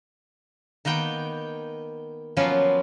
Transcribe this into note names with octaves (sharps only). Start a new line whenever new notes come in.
D#3 A#3 B3 G5
F3 F#3 A#3 B3 C#4 F4